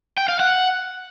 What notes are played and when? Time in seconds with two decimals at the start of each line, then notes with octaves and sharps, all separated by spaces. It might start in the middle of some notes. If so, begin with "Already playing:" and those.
0.18 G5
0.29 F5
0.40 F#5